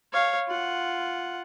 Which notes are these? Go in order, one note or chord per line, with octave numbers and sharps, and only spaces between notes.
C#5 F5
F4 F#5